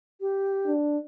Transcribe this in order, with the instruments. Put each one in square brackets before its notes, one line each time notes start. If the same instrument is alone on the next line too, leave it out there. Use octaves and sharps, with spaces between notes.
[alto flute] G4
[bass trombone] D4